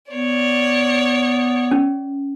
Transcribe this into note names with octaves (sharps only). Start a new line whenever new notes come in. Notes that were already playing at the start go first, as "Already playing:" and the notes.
B3 C#5 D5
C#4